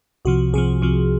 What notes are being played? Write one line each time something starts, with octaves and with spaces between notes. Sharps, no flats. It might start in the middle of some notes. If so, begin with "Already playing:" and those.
C2 C3 F3 F#4
C2 C3 F3 G#4
C2 C3 F3